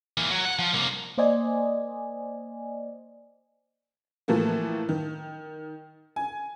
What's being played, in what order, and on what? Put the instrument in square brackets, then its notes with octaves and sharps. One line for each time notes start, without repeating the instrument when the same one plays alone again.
[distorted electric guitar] E3 A#3
F#3
F#5
F3
C2 A#3
[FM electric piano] A#3 C5 D5 D#5 G#5
[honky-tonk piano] A2 E3 F3 A3 A#3
D#3
G#5